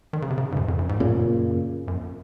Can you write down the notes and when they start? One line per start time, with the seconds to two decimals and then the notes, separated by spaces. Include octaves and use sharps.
0.13 D#3
0.22 C#3
0.30 C3
0.38 C#3
0.52 G#2
0.57 F#2
0.68 F2
0.79 F#2
0.89 G#2
1.00 F#2 A#2 C#3
1.88 F#2